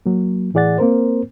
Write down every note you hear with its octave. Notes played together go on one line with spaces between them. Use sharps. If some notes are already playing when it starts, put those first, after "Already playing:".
F#3 A#3
A2 E3 G#4 D5 F#5 A6
A#3 C4 A#4 C5